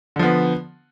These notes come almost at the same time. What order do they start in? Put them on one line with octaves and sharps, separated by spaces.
D3 F3 B3